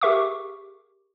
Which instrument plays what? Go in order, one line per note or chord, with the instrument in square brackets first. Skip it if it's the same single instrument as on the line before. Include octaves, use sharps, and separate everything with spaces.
[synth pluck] G4 G#4 A#4 E5 C#6 D6